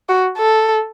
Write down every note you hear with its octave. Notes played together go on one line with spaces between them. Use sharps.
F#4
A4